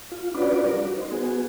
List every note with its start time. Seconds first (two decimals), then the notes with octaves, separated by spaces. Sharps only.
0.12 F4
0.34 C#4 D4 F4 F#4 B4 D5
0.66 G3 A#4 D5
0.81 F#4
0.97 D#4 C5
1.12 B3 F#4 G#4